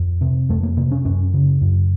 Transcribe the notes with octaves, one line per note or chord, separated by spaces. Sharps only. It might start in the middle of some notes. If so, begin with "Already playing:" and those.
Already playing: F2
C3
F2 A3
A#3
C3 A#3
C#4
F#2 C#4
C#3
F#2